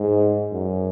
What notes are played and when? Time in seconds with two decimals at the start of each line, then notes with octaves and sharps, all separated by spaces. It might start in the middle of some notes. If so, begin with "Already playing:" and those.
Already playing: G#2
0.52 F#2